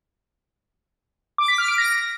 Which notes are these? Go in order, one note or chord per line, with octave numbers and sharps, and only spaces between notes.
D6
B6
F6
D7
A#6